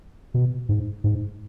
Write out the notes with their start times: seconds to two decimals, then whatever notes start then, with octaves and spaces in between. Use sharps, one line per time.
0.34 B2
0.69 G#2
1.04 G#2